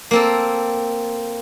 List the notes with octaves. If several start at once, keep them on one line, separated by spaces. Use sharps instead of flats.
A#3 C4 A4